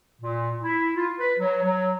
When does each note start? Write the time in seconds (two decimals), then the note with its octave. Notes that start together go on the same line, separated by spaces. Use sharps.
0.20 A#2
0.63 E4
0.96 F4
1.19 B4
1.39 F#3
1.63 F#3